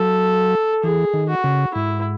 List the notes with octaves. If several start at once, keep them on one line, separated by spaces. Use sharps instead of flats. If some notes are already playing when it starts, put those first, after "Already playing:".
Already playing: F#3 A4
E3 G#4
D#3
F#4
C#3
G#2 E4